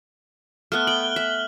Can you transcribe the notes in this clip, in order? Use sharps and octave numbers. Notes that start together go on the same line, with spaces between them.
A3 B3 F6 F#6
G5 F#7 G7
E5